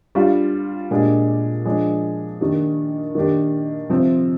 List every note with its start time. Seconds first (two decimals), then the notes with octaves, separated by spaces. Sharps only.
0.15 G3 D4 F4
0.91 A#2 G#3 D4 G4
1.65 F3 G#3 D4
2.40 D#3 A#3 D4 G4
3.15 D#3 A#3 D4 G4
3.90 C3 F3 C4